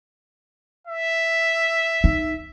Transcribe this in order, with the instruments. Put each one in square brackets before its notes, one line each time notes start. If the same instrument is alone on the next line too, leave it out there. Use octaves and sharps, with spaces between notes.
[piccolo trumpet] E5
[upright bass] D#4